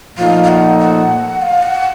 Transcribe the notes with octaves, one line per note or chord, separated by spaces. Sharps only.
A#2 F3 A3 D#4 A4 F5
F5
F#5
F#5
F5
F#5